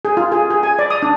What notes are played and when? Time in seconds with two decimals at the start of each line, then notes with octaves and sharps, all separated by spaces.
0.05 G#4
0.17 F4
0.32 G#4
0.50 G#4
0.63 G#5
0.79 D5
0.90 D#6
1.02 D4